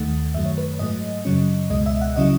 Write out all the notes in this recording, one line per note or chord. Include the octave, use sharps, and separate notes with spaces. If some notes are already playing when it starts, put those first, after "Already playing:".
Already playing: D#2 D#3 A3 F#5
F#2 D#3 F#3 A3 E5
C#5
B4
G#2 F#3 A3 D#5
F#2 C#3 F#3 C#4
C#2 B2 G#3 D#5
E5
F#5
C#3 F#3 C#4 E4 D#5